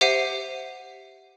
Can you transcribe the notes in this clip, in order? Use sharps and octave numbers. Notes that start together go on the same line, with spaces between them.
G4 C5 E5 F#5 C7 D#7